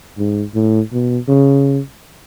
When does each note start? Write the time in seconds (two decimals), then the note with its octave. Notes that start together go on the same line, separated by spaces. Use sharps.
0.18 G#2
0.55 A2
0.93 B2
1.28 C#3